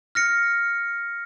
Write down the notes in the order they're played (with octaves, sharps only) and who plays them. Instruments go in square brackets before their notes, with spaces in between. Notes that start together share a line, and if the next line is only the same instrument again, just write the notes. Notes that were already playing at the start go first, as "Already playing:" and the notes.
[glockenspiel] F6 A#6 C#7